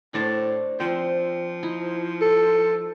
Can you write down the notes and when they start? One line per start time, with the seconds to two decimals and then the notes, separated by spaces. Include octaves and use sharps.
0.14 A2 D4 C5 A5
0.80 F3 C4 C5
1.63 D#4 E4
2.22 A4